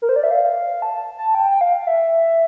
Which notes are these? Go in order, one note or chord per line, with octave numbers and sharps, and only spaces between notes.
A#4
C5
D5
E5
F5
A5
A5
G5
G5
F5
E5